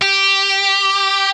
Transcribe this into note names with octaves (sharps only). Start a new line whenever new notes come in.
G4